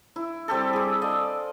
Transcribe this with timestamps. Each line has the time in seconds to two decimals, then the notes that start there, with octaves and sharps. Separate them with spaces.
0.16 E4
0.48 G3 C4 G4 A4
0.73 G#4 D6
1.02 A4 D5 D#5 F5